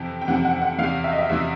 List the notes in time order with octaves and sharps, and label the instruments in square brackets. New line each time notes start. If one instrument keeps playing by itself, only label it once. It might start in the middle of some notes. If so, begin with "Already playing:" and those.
Already playing: [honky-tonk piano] F2 C3 E3 G5
G5
F2 C3 E3 F#5
F#5
F#5
E2 C3 E3 F5
E5
D#5
E5
E2 C3 E3